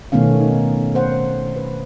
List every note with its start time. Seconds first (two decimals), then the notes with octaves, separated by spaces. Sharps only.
0.12 B2 D#3 A3 B3 C#4 F5
0.40 D#4
0.95 C5 F#5
1.56 B4